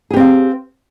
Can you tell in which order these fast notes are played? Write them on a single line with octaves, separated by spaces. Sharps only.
G#4 G4 C4 F5